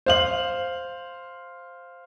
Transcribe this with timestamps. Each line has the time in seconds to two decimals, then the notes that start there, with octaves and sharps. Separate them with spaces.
0.06 C5 F5 F#7